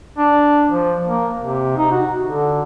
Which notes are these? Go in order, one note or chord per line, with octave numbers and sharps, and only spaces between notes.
D4
F3
A#3
C3
D#4
F#4
D3